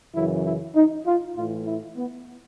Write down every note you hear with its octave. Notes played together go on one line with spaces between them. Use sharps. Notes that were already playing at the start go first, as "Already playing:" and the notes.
F#2 C#3 E3 E4
E4
D#4
F4
A2 E3 F4
E4
B3